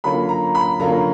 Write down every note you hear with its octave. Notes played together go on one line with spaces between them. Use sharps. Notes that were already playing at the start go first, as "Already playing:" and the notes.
D3 F#3 A#3 C#4 F4 B5
A#5
B5
D3 F#3 A#3 C#4 F4 A#5